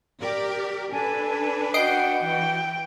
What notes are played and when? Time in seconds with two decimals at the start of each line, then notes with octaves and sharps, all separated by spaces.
0.20 G4 A#4 D5
0.92 D4 A4 B4 G#5 A5
1.74 F#4 D#5 F#5 G5 C7 D7
2.22 E3 G5